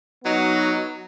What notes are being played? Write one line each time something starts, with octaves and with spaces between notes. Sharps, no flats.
F#3 B3 D#4 F#4